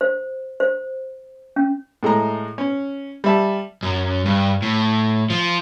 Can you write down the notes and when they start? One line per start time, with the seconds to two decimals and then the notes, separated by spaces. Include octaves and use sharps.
0.01 C5
0.60 C5
1.56 C#4
2.03 A2 G#3 A3 A#5
2.58 C#4
3.24 G3 E5 A5
3.83 F#2
4.26 G2
4.62 A2
5.30 F3